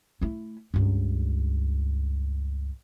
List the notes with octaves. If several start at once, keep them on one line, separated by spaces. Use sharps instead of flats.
A3 E4
C#2 G2